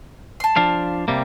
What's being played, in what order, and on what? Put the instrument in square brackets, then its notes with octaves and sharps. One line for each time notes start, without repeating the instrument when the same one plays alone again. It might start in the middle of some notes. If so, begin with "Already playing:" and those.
[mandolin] A5 C6
[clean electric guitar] F3 D4 F5
C3 G3 A#3